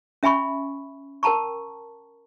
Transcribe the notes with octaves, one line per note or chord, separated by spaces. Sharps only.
C#4 E5 G#5 B5 C#6
A#4 G5 A5 A#5 C#6